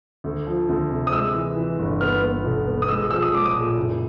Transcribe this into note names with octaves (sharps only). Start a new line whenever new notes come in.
D2
F3
D2
C3
D#6
G#3 E6
E3
E3
G1
B3 F6
B3
B1
B3
D#6
G#3 E6
F3 E6
D#6
G#3 D6
D#6
A#2
F#1